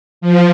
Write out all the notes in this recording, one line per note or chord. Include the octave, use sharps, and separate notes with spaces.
F3